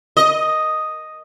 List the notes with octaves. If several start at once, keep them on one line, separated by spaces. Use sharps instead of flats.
D#5